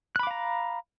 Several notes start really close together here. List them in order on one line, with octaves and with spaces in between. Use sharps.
F#6 B5 D6 F5 A#5